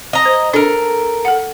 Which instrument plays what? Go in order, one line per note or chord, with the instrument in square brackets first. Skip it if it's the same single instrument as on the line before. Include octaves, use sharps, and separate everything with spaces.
[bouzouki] D#5 A#5
[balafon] C5
[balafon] D4 [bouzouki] A4 A#4
[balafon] A4 F#5